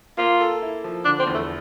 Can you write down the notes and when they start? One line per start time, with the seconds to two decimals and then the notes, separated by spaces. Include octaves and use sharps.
0.17 A#3 F4
0.40 A4
0.62 E4
0.84 F3
1.05 D3 D4
1.19 C4
1.27 E2
1.34 A3